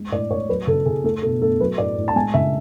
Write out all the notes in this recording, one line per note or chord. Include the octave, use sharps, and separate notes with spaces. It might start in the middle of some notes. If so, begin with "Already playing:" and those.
Already playing: G#3
A2 D5
A2 C#5
F#3 B4
C#3 A4
C#3 G#4
A3 A4
B2 A4
A3 A4
F#3 B4
A2 D5
A2
A5
G#3 G#5
C#3 E5